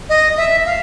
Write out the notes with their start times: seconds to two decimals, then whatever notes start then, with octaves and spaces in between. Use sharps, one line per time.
0.09 D#5
0.37 E5
0.66 F5